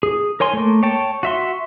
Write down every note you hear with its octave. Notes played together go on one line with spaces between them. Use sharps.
G#4
A#4 C#5 G#5 C6
A3 A#3
C#5 G5 A5
F#4 E5 C6